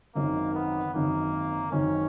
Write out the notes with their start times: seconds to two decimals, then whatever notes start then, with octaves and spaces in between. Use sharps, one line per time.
0.15 G#1 F#2 D#3 A#3
0.55 B3
0.94 G#1 F#2 D#3 A#3
1.72 G#1 F#2 D#3 C#4